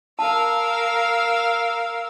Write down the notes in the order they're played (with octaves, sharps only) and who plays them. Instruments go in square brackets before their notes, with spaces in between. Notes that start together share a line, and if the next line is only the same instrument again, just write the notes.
[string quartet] A#4 F5 E6 [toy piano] A5